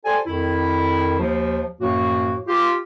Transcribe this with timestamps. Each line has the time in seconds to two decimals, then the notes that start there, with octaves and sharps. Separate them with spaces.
0.05 G4 A4 C5 D5 G#5
0.26 F2 D#3 E4
1.19 D#2 F3
1.80 F#2 A2 F3 A#3 F#4
2.47 F4 G4